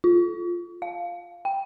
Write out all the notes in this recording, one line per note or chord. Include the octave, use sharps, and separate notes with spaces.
F4
F5
G5